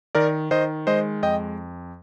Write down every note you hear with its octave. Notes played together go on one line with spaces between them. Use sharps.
D#3 A#4 D5
D#3 C5 D#5
G#3 C5 D#5
F2 D#5 G5